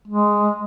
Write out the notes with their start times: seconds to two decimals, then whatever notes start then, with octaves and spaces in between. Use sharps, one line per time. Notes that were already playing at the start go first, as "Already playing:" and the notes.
0.07 G#3